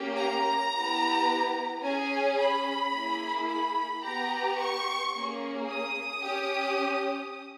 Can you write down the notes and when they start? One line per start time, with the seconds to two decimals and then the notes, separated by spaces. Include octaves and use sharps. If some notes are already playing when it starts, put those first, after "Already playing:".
Already playing: A#3 C#4 G4
0.18 A#5
0.73 B3 E4 G4
1.83 C#4 G#4 G#5
2.39 B5
2.94 A#3 E4 G#4
3.48 B5
4.04 B3 G4 A#5
4.59 C#6
5.14 A#3 C#4 G#4
5.69 D#6
6.24 C#4 G4